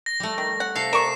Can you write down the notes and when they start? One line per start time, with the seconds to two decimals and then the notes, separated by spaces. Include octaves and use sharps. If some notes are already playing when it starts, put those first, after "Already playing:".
0.06 A#6
0.20 G3 A3
0.38 D#3
0.60 F#5
0.76 C3 A4 F5 C7
0.93 A#4 D5 C#6 E7